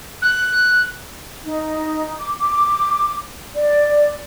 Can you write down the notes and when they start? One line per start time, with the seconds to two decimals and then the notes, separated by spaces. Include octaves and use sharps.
0.22 F#6
1.44 D#4
2.17 D6
2.37 D6
3.55 D5